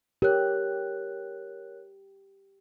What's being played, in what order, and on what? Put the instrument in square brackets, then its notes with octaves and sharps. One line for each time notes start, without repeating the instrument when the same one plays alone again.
[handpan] G4 [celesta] A#4 C#5 F#6